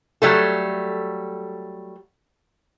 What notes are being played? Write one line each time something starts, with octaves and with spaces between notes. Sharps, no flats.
F#3 G3 A3 A4